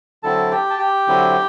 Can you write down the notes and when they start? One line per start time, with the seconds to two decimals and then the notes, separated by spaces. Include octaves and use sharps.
0.23 D3 F#3 C4 E4 A4 A5
0.51 G4 G5
0.70 A5
0.79 G4 G5
1.07 D3 F#3 C4 E4